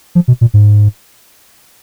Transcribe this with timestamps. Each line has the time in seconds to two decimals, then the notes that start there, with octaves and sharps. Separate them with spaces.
0.15 F3
0.28 B2
0.41 A#2
0.54 G#2